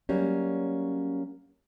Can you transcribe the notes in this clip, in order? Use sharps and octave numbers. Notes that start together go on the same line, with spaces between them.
F#3 G3 A#3 C#4